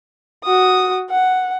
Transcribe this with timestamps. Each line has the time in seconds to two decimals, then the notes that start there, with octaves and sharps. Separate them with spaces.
0.44 F#4 D#6
1.10 F#5